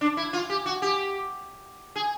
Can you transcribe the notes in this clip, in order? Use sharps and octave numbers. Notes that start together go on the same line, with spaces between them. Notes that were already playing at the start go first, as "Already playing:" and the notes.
D4
E4
F4
G4
F#4
G4
G#4